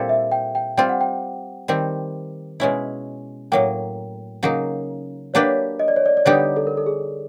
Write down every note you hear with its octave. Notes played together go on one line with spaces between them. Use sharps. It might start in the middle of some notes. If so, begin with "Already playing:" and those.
Already playing: A#2 G3 C4 E4 A4 F5
E5
G5
G5
G3 C4 F4 G5
F#5
G5
D#3 G3 C4
B2 G#3 C#4 E4
A2 F#3 A#3 G5
C#3 F#3 A#3 D#4
F#3 A#3 D4 G4 B4 C#5
D#5
D5
C#5
D5
D5
D3 G3 B3 D#4 G4 C#5
A4
A#4
A4
G#4